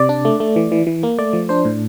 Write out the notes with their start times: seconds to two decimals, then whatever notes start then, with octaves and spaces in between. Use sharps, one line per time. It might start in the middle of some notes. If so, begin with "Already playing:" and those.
Already playing: C3 D5
0.09 D4
0.25 A3
0.40 A3
0.56 E3
0.72 E3
0.87 E3
1.03 A#3
1.18 A3 D5
1.33 F3
1.49 D4 C5
1.65 A2